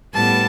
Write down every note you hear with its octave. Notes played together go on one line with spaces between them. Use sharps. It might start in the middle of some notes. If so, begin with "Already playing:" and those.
A2 G3 B3 A5